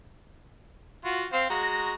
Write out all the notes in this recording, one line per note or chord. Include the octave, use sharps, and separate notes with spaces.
F4 F#4
C4 C5 F5
G#3 F#4 A#5